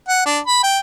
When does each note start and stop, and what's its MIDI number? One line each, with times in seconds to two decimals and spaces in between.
0.09 0.24 78
0.25 0.39 62
0.47 0.62 83
0.63 0.79 79